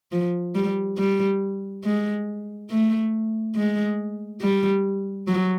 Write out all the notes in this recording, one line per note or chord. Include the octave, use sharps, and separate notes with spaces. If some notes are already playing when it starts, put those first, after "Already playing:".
F3
G3
G3
G#3
A3
G#3
G3
F#3